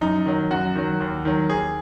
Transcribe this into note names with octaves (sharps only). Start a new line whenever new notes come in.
F#2 D#4
D#3 F#3
F#2 F#4
D#3 F#3
D#2
D#3 F#3
D#2 G#4